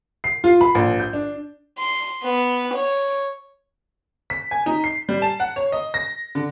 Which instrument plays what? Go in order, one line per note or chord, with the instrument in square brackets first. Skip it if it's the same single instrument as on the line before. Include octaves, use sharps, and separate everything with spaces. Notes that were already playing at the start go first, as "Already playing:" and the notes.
[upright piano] C7
F4
B5
A#1
G6
D4
[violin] C6
B3
C#5
[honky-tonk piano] B6
G#5
D#4
C7
G3
A5
F#5
C#5
D#5
A#6
D3